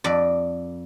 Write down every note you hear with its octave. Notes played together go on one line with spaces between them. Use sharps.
F2 D5